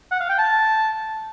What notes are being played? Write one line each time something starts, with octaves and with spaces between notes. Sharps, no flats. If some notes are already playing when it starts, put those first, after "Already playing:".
F#5
F5
G5
A5